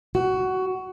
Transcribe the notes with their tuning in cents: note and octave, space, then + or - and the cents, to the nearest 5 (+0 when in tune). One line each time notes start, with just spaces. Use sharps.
F#4 +15